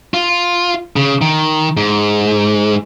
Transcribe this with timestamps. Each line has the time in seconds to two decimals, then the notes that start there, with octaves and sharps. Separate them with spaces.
0.14 F4
0.96 C#3
1.21 D#3
1.77 G#2